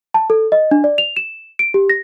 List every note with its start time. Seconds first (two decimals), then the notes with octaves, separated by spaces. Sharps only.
0.14 A5
0.30 A4
0.52 D#5
0.71 D4
0.84 D5
0.98 F7
1.17 E7
1.59 D7
1.74 G4
1.90 A#6